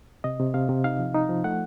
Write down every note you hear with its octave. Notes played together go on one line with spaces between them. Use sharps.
C3 D#5
C3
C3 F5
C3
D#4 F5
F3
D#4
F3
A3 F#5